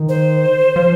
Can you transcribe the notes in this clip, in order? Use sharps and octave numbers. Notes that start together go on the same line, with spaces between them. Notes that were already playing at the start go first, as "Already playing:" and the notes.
Already playing: D#3
C5
F3